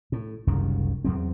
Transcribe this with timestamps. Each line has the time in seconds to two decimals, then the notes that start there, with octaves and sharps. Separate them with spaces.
0.12 A2
0.47 F#1 C2 F#2 D#3
1.05 E2 F#3 C4